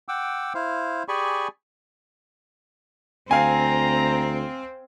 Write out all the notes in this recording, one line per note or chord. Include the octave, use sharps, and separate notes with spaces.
F#5 G5 D6 E6
E4 C5 F5
G4 G#4 D5 G#5 B5 C#6
D2 C4 F5 G#5 A#5